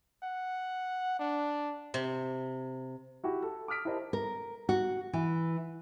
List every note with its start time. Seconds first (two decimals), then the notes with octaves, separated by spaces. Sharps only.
0.24 F#5
1.19 D4
1.94 C3
3.23 E4 F#4 G4
3.43 A4
3.68 D6 D#6 F6 B6 D7
3.85 E4 G4 A#4 C5 D#5 A5
4.13 A#4
4.69 F#4
5.13 E3